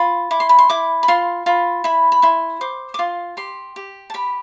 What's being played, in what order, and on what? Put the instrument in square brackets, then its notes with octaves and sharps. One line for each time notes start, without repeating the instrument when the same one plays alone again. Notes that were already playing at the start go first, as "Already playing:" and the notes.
Already playing: [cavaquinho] F4 B5
E4 D6
C6
B5
C6
E4 D6
B5
F4 C6
F4 B5
E4 B5
B5
E4 C6
C5 D6
D6
F4 C6
G4 C6
G4
A5
G4 B5